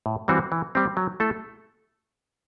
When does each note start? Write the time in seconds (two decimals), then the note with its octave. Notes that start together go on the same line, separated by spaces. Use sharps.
0.06 A2
0.28 E3 G3 C4 F#4
0.52 E3
0.75 G3 C4 G4
0.97 F#3
1.20 A3 E4 A4